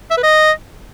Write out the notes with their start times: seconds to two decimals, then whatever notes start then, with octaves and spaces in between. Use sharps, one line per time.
0.11 E5
0.17 B4
0.23 D#5